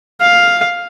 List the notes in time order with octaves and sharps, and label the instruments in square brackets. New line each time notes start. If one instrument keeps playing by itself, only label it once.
[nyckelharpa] F5